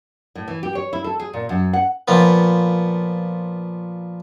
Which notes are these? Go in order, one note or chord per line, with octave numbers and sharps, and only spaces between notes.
A2
E3
G4
C#5
E4
A4
G#4
A#2
F#2
F#5
A#2 F3 B3